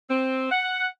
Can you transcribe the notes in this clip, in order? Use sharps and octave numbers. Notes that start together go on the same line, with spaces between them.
C4
F#5